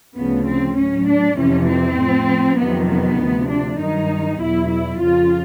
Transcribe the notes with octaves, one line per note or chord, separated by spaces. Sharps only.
D2 C#3 F3 B3
C4
A2 F#3 C#4
D4
F2 C3 E3 C#4
C4
A2 F3
F2 C3 D#3 F#3 B3
B3
D2 C3 F3
D4
G2 D#3 F#3 D#4
E2 B2 F#3 E4
E4
F2 C#3 F3 F4